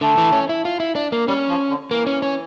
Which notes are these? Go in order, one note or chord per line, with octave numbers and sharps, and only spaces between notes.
D3 A3
E3
C#4
E4
F4
E4
D4
A#3
G3 C#4
F3
D3
E3 A#3
C#4
C#4